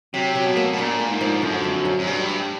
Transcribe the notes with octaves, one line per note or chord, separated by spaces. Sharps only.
C3 F#3
F#3
B2
A#3
B2
A#2 D4
A#3
G#2
F3
F#2 D3
F2
F#3
F#2
G2 G3
G3